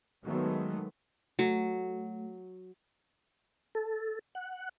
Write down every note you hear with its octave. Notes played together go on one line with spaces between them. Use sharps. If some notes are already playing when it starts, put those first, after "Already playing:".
D#3 F#3 G#3 A3 B3
F#3 A3 F#4
A4
F#5